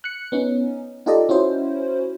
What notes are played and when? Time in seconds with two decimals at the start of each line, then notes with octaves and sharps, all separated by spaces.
0.04 F#6 C#7
0.32 B3 C#4 D#4
1.06 D#4 F4 G4 A4 D5 D#5
1.29 C#4 E4 F#4 C5